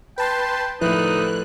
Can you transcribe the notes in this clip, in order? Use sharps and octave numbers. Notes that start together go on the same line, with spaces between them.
B4 G5 A5 C6
A2 D3 D#3 F3 D#4 E4 B4 F#6